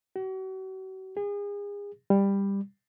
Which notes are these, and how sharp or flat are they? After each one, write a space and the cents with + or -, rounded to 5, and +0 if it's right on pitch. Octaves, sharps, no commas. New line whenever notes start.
F#4 +40
G#4 -35
G3 +15